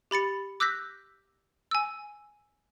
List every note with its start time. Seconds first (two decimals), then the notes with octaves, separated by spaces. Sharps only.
0.11 G4 B5 A6 C#7
0.60 D6 E6 F#6 G6 A#6 B6
1.71 G#5 E6